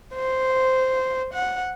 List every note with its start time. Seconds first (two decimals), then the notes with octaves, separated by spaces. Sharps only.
0.15 C5
1.34 F#5